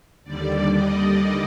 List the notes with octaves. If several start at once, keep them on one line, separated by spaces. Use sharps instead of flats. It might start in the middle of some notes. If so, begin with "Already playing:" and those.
D#2 D3 G3 D5
D#5